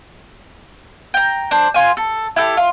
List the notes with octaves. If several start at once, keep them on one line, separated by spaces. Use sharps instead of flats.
G5 A#5
D4 C5
F4 G#5
A4
E4 G4 A4
F4